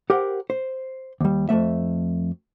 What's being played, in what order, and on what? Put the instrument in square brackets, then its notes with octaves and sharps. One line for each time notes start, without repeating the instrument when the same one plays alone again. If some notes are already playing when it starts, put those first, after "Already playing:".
[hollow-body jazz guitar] G4 A#4 C5 F#5
C5
D#2 G3
F2 B2 A3 E5